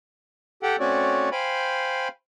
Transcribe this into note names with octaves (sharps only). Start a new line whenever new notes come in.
G4 A4 F#5 G5
A3 C4 C#4 F#4 C#5 D5
C5 F5 G5 G#5 B5